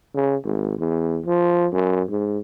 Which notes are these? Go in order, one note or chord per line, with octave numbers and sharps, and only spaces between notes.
C#3
G#1
E2
F3
F#2
G#2